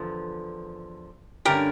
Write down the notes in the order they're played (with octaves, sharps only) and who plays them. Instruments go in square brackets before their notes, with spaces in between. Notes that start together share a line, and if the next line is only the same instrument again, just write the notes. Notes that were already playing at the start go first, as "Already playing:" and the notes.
Already playing: [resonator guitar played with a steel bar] E2 D3 F3
[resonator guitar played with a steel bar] G2 D3 A3 C#4 [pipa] G4 A#4